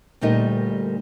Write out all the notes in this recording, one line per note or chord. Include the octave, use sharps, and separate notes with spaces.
D2 A#2 G3 A3 D#4 A#4